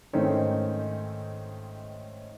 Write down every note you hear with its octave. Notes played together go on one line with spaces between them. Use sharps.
G#2 D#3 A3 C4 C#4 D#4